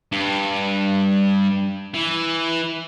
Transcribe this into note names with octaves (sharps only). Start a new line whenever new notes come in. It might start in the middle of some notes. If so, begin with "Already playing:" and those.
G2
E3